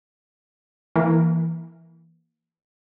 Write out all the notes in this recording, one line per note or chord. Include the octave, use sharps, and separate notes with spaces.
E3 A#3